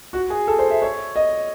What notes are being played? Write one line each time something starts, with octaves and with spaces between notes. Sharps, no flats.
F#4
G#4
A4
C5
E5
C#5
D#5